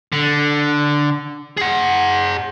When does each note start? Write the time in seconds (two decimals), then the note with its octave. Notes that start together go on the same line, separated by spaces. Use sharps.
0.12 D3
1.57 G#4 F#5